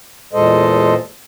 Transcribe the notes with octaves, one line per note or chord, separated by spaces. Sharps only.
E2 A#2 G#3 A4 C5 D#5